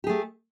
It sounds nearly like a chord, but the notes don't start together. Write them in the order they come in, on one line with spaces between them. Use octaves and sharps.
G4 G#4 A3